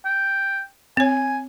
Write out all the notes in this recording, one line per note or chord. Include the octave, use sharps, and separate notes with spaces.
G5
C4 C#5 G#5